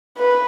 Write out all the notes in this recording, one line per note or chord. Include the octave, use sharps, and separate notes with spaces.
B4